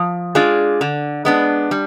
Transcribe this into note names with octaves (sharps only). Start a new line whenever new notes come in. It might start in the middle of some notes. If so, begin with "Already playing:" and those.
Already playing: F3
G#3 D4 F4 G#4
D3
G#3 B3 D4
G3